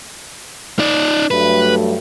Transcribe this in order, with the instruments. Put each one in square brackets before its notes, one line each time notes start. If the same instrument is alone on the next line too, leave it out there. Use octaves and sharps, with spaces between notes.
[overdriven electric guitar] D#4 D5
[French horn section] G2 F#3 A3 [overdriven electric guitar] B4